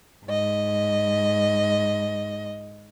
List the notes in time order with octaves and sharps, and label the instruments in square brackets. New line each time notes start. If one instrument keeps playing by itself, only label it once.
[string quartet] G#2 D#5